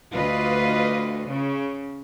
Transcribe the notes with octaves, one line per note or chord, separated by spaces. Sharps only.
D2 F4 B4 D#5
C#3